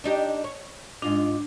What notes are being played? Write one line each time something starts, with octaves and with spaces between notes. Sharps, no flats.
D4 D#4 G4
C#5
G#2 D4 F4 D#5